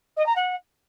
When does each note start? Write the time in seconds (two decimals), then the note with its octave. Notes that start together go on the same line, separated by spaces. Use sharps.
0.17 D#5
0.26 A#5
0.36 F#5